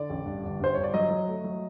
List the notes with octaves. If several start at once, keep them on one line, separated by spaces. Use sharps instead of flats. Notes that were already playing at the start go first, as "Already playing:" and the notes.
Already playing: D3 D5
A1
G2
G1
G2 C5
G1 C#5
D5
F#3 D#5
F#3
A3
F#3